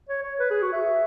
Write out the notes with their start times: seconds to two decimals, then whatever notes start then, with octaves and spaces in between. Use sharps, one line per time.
0.09 C#5
0.23 C#5
0.39 B4
0.51 G#4
0.62 F#4
0.73 E5